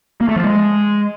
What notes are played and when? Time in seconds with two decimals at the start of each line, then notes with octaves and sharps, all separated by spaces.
0.21 A#3
0.28 A3
0.36 F3
0.44 G#3